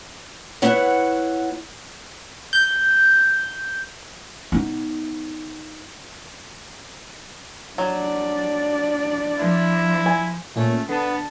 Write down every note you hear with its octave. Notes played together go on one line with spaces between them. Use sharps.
B3 E4 C#5 F#5
G6
B3 D#4
F#3 D4 D5
F3 E4
G#5
A#2 A3 C#4
D3 B3 A5